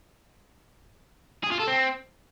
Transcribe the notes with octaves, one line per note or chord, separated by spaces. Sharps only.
G#4
F4
A4
C4